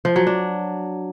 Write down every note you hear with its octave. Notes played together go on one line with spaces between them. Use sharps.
F3
F#3
D4